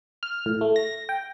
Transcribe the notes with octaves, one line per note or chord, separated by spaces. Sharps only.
F6
A2
A3
A#6
G5